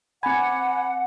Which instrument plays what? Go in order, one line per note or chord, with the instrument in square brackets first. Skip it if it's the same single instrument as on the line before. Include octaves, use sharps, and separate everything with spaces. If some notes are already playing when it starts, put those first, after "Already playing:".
[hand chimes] C4 B5 [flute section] F#5 [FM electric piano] G#5